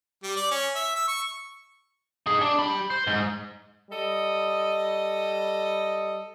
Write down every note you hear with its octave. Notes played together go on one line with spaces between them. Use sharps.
G3
D5
C#4
E5
E6
C#6
D#4 G#4
D4
G4 B5
C5
G#2
G3 A4 D#5